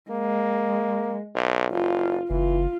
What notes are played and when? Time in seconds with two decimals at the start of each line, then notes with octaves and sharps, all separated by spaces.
0.11 G#3 A#3
1.35 B1
1.72 F#1 F4
2.30 F#1 E3 F4